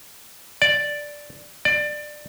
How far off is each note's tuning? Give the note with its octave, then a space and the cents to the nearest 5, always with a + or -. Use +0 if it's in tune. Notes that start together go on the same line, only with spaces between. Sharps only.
D5 +0
D5 +20